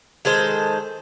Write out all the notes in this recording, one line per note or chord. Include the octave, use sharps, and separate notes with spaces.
D#3 G#3 A4 C5